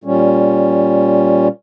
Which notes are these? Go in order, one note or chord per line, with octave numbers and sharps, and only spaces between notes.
A#2 G3 C#4